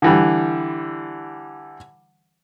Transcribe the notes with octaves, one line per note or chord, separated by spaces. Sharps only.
D3 E3 G3